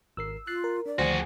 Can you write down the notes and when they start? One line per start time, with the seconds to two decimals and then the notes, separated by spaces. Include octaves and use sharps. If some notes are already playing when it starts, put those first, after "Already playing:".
0.17 G#1 A#4 E6 C7
0.47 F4 F#6 A6 C7
0.64 A#4
0.86 D4 D5
0.99 D2 D#3 F3 F#4 G#4 C5